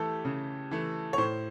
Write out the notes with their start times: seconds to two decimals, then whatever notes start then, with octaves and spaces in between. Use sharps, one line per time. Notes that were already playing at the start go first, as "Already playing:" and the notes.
Already playing: E3 A3 G4 A4
0.25 C#3
0.71 E3 A3
1.13 C#5
1.18 A2 C5